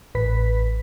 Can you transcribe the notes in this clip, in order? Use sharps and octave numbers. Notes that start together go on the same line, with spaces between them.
A1 B4 B6